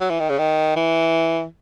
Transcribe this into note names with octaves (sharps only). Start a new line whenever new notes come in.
F#3
E3
D#3
C#3
D#3
E3